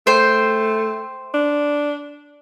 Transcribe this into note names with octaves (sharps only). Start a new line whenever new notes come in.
A3 C5 G5
D4